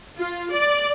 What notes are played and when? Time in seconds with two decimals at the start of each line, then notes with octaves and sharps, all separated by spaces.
0.17 F4
0.52 D5